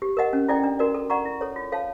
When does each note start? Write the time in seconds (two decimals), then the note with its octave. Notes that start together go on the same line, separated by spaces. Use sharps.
0.02 G4
0.17 A#4 D#5 F#5
0.33 C#4
0.48 E4 A4 D5 G5
0.63 D4
0.79 F#4 A#4 D5
0.94 A4
1.10 D5 F#5 A#5 C#6
1.25 E4
1.41 A4 C#5
1.56 F4
1.72 A4 C#5 F5 A5